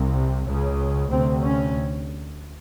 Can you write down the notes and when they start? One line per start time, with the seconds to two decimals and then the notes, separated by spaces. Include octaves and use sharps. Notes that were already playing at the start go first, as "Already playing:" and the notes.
Already playing: C2 C3
0.47 C#2 C#3
1.11 D2 C3 C4
1.42 C#4